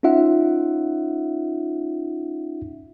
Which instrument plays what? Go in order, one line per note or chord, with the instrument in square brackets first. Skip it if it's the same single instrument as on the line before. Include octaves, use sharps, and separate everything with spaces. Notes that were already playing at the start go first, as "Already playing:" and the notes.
[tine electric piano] C#4 D#4 F4 E5 F#5